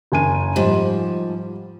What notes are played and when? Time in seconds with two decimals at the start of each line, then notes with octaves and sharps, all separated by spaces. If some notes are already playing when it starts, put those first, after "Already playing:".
0.12 F#1 G#5 D#7
0.56 G#2 F3 G3